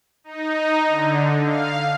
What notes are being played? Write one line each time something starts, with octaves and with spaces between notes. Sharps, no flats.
D#4
D3
F5